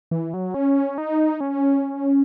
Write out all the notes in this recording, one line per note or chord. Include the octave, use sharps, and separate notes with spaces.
E3
F#3
C#4
D#4
C#4